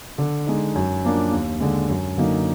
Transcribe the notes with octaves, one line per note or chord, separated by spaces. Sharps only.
D3
G#3 D#4
F#2
F3 A#3 D4
D#2
D3 G#3
F#2
D3 F#3 A#3 D#4